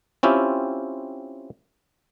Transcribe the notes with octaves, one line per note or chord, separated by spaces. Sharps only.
C4 C#4 E4 F4 G4